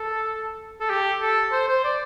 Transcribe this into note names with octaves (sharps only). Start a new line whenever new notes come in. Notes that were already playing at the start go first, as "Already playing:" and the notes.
Already playing: A4
A4
G4
A4
C5
C5
D5